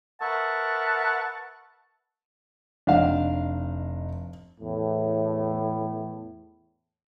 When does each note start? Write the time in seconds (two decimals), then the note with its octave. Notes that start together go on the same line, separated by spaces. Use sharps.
0.21 A#4 B4 E5 F#5 A5 C#6
2.87 F1 D4 D#4 F5
4.61 E2 A2